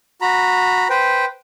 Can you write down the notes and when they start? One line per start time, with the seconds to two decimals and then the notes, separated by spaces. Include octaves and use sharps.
0.21 F#4 A#5 B5
0.90 B4 C5 G5